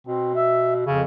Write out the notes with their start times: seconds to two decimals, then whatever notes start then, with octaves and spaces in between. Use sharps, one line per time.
0.07 B2 C4
0.36 E5
0.87 F2 C#3